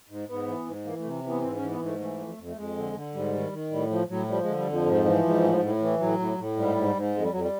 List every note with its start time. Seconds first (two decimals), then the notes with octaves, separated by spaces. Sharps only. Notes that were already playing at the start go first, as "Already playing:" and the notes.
0.10 G#2
0.28 G#2 B3
0.47 E3
0.66 G#2
0.85 E3 A#3
0.99 A3
1.04 C3
1.24 E3 B3
1.42 G#2 C4
1.56 C#4
1.61 E3
1.70 B3
1.80 G#2
1.85 A3
1.99 E3 A3
2.19 F2
2.38 F2
2.47 A3
2.56 F2 G#3
2.76 D3
2.95 D3
3.14 G#2 G3
3.33 D#3
3.52 D#3
3.71 A2 G3
3.90 F3
4.09 A2 F#3
4.28 F3 G3
4.43 D3 G#3
4.57 G3
4.66 F2 F3
4.86 G#2
5.05 E3
5.24 G#2
5.43 A2
5.61 A2
5.81 E3
6.00 A2 F#3
6.19 A2
6.38 A2
6.57 G#2 G3
6.76 G#2
6.95 G#2
7.14 F2 G#3
7.22 G3
7.32 F2 F#3
7.40 G3